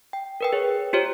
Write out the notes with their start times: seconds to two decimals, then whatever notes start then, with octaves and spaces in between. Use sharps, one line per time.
0.13 G5
0.41 A#4 B4 G5
0.53 G#4 C#5
0.93 F4 G4 C5 C#5